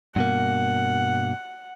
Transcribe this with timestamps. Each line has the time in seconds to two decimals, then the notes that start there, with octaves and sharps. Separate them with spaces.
0.16 G2 B2 A#3 F#5